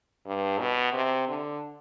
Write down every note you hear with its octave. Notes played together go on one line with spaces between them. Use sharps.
G2
B2
C3
D3